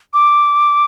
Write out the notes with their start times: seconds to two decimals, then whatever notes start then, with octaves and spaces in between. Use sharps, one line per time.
0.14 D6